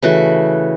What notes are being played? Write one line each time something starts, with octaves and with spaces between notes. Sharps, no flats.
C#3 E3 A3 F#4